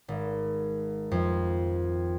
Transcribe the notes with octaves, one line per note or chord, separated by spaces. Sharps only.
G#1
F2